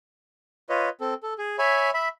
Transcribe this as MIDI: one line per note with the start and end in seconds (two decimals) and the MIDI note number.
0.69 0.89 65
0.69 0.89 71
0.69 0.89 73
0.69 0.89 75
1.01 1.14 60
1.01 1.14 69
1.23 1.34 69
1.38 1.57 68
1.59 1.91 73
1.59 1.91 76
1.59 1.91 80
1.59 1.91 83
1.94 2.08 76
1.94 2.08 83